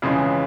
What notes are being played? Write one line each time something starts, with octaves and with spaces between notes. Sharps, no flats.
F2 C#3 E3 G#3